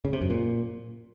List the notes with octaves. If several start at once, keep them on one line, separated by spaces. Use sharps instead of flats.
C#3
C3
F#2
A#2